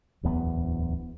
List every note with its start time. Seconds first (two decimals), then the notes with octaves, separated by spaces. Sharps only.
0.23 D1 E2 B3